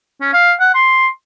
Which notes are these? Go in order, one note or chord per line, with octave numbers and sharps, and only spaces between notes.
C#4
F5
F#5
C6